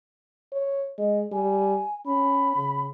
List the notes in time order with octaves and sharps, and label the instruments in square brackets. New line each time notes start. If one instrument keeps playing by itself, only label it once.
[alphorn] C#5
[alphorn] G#3 [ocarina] D#5
[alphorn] G3 [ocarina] G#5
[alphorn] C#4 [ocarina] B5
[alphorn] C#3